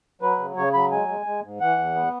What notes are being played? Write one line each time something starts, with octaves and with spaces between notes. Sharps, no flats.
F#3 B4
C#3
C#3 C#5
F#3 B5
G#3 G#5
G#3
G#3
G#2
E3 F#5
E2
B3